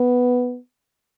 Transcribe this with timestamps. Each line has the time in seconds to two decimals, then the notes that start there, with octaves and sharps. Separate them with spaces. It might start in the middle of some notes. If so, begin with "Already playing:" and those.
Already playing: B3